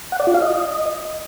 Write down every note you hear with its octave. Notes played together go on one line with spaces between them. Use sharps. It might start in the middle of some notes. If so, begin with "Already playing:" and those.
F#5
D5
F4
F5
D#5